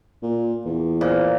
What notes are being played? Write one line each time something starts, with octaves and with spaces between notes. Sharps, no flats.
A#2
E2
A#2 C5 F5